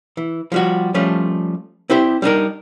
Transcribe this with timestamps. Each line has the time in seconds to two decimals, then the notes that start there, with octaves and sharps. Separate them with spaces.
0.17 E3
0.52 F3 G3 F#4
0.94 F3 G3 A3 C#4 F4
1.90 C4 E4 G4 C5
2.22 G3 D4 D#4 A#4